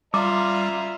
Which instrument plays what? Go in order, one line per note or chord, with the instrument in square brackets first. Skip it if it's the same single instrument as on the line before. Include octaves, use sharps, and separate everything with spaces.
[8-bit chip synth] G3 [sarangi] F4 [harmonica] E5 A#5 [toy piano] D6